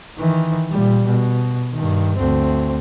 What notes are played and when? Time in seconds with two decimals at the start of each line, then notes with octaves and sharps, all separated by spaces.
0.18 D#3 E3
0.70 A#2 G3
1.07 B2
1.73 G2 D#3
2.16 D2 C4